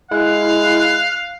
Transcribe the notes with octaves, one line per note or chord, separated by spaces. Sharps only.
G#3 E4 F5 F#6